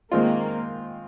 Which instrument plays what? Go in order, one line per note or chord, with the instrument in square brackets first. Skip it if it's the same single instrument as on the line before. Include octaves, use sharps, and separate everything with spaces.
[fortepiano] D#3 G#3 C4 F4 [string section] A#3